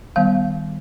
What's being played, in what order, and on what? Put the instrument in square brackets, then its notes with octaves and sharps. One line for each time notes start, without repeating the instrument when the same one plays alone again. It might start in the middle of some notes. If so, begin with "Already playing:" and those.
[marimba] D#3 G3 B3 F5